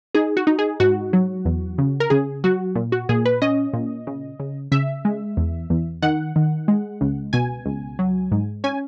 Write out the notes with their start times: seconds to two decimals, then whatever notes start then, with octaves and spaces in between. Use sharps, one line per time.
0.15 D#4 G#4
0.37 F#4
0.47 D#4
0.59 G#4
0.80 G#2 F#4
1.13 F#3
1.45 E2
1.78 C#3
2.00 A#4
2.10 C#3 G#4
2.44 F#3 F#4
2.75 A#2
2.92 F#4
3.09 A#2 G#4
3.25 B4
3.42 C#4 D#5
3.73 A#2
4.07 C#3
4.40 C#3
4.72 C#3 E5
5.05 G#3
5.37 E2
5.70 E2
6.02 D#3 F#5
6.36 D#3
6.68 G#3
7.01 C#2
7.33 B2 G#5
7.66 C#2
7.99 F#3
8.32 G#2
8.64 C#4 G#5